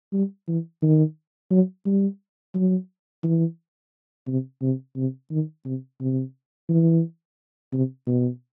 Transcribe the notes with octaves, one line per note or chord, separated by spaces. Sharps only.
G3
E3
D#3
F#3
G3
F#3
E3
C3
C3
C3
D#3
C3
C3
E3
C3
B2